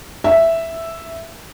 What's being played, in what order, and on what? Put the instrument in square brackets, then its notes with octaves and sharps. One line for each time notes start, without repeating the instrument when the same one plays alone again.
[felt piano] E5